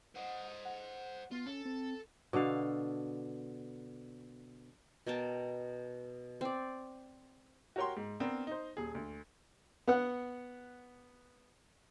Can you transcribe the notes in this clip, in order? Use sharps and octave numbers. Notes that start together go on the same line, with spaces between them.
C5 D#5 F#5
F#5
B3 F4
C#4 A4
C4
B2 D3 A4 F5
B2 A#4 G5 A5
C4 D5
F#4 G4 A#4 C#5 G5 C6
G#2
B3 C4 D4 A#4
D#4 C5
D#1 G#4
D2
B3 F#5